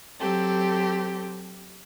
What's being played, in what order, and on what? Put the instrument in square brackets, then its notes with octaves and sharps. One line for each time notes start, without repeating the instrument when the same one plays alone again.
[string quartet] F#3 C4 G4 A4